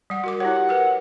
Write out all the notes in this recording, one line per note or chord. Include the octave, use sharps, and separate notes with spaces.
G3 F#5
F#4 A#4 D6
E4 G4 C#5 F#5
A#4 B4